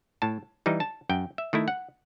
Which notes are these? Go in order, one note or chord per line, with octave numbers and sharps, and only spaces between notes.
A2 A5
E3 G3 D#4
A5
F#2 G5
E5
D#3 A3 E4
F#5